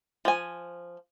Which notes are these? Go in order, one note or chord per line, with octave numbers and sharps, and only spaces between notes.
F3 G#5